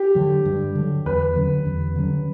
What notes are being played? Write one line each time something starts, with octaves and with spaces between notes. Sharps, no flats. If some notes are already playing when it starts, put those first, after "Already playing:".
Already playing: G4
D3 F#3
G2
D3 F#3
E2 B4
D3 F#3 C#4
E2
D3 F#3 C#4